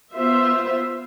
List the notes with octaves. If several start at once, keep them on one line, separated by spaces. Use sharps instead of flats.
B3 F4 C5 E5